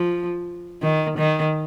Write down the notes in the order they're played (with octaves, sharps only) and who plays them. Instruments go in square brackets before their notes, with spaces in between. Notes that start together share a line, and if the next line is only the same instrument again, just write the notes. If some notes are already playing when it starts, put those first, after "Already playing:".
Already playing: [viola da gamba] F3
D#3
D#3